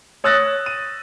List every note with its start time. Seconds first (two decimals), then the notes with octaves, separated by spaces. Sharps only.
0.24 C#5 D#6 E6 F#6 A6 A#6
0.66 D#7